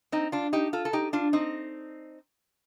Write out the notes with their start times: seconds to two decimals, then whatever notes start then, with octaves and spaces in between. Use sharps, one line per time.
0.12 C4 D#4
0.32 D4 F4
0.53 D#4 G4
0.73 F4 A4
0.85 A4
0.93 D#4 G4
1.13 D4 F4
1.33 C4 D#4